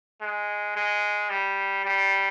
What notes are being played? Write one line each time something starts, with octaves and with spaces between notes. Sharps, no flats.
G#3
G#3
G3
G3